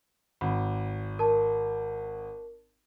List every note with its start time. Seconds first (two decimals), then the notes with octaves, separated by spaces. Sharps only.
0.41 G#1 B5
1.19 A#4 A5